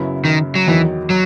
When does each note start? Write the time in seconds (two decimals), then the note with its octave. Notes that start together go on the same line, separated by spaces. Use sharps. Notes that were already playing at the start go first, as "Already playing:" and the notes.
Already playing: F#2 C#3 F#3 B3 E4
0.25 D#3
0.56 F#3
0.68 E2 D#3 E3 F#3
1.10 F#3